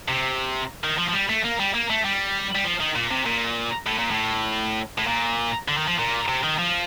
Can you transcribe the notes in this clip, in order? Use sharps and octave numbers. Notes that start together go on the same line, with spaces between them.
C3
D#3
F3
F3
G3
A3
A#3
G3
A#3
A3
G3
G3
F3
D#3
A#2
C3
A#2
A2
A#2
A2
A2
A#2
D3
D#3
F3
A#2
C3
D#3
F3